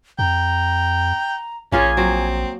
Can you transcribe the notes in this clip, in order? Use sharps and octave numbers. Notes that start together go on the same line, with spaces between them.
F2 G5 A#5
A#1 A#3 C#4 F4 G#4 G#5
F#3 C4